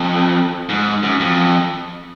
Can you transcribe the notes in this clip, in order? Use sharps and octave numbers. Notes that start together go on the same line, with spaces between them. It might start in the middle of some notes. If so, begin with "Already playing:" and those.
Already playing: F2
G#2
F#2
F2